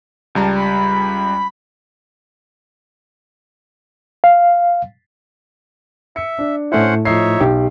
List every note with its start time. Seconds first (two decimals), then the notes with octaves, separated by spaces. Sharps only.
0.35 C#2 G3 A5 A#5
0.56 B5
4.24 F5
6.16 E5 C#7
6.39 D4
6.72 A2 A3 C#4 E4 C5 F#5
7.05 F3 D#4 C#5 E5 C7
7.41 B1 G4